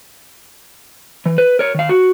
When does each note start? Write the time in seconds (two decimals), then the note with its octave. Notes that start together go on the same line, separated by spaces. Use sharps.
1.26 E3
1.38 B4
1.59 A#4 C#5
1.74 D#3 F5
1.89 F#4